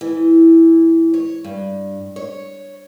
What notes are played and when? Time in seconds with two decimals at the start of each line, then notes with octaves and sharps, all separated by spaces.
0.01 E3
1.14 C#5
1.44 G2
2.16 C#5